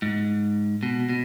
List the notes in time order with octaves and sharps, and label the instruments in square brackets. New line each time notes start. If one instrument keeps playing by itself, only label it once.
[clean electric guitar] G#2
B2
B2